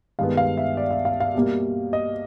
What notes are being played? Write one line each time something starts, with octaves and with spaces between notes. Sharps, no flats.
G2 D#3 G#3 B3 F5
F5
E5
D5
E5
F5
F5
B2 G3 A#3
D#5